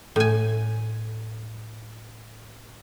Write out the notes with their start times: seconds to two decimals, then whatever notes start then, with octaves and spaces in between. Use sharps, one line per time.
0.16 A2 G#5